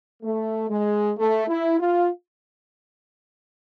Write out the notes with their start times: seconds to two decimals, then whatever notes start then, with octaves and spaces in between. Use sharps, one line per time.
0.23 A3
0.69 G#3
1.17 A3
1.48 E4
1.80 F4